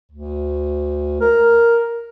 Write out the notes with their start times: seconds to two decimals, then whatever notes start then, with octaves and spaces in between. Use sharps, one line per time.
0.12 D2
1.21 A#4